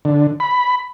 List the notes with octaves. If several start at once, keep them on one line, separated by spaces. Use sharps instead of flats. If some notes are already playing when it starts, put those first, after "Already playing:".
D3
B5